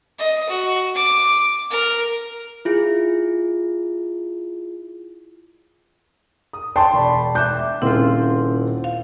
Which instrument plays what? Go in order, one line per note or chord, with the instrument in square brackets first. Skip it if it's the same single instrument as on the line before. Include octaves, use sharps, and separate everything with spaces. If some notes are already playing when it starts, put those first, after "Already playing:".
[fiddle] D#5
F#4
D6
A#4
[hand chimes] E4 F4 G#4
[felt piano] D#6
[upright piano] G5 A5 C6 [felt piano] C#6
[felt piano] E1 D5 B5
[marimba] E5 D6 F#6 [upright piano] G6
[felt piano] D#1 C#3 [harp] C4 F4 [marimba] E4
[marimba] F5